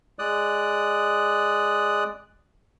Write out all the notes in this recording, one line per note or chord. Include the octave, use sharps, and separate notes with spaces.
G#3 D5 D#6 F#6